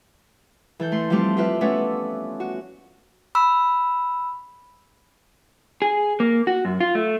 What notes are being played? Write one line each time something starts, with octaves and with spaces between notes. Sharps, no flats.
E3 A4 G6
A3 C6
F3 G3 A3 C4 G4
F4 G4 B4 E5
A3 B3 C#4 B4 D5
F#4
B5 E6
G#4
A#3
F#4
F#2
F4
A3